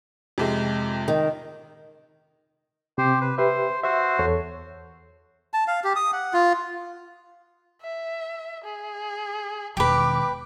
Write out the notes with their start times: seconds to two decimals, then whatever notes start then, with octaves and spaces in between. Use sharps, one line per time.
0.38 F2 C3 G#3
1.08 D#3
2.98 C3 G4 C5
3.21 B4
3.38 G4 B4 C5 E5
3.83 F#4 C5 E5 E6
4.19 E2 A4 C#5
5.54 A5
5.67 F5
5.84 G4
5.96 D#6
6.13 F#5
6.33 F4
7.82 E5
8.64 G#4
9.77 E1 D#3 G4 B4 D6